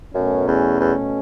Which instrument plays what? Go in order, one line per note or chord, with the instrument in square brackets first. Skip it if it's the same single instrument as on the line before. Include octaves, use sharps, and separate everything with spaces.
[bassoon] F#2 [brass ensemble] B2 A3 C#4
[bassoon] E2
E2